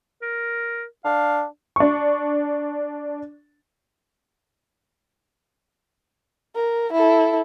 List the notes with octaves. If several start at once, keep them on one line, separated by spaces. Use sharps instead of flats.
A#4
D4 F5
D4 C#6
A#4
E4 A4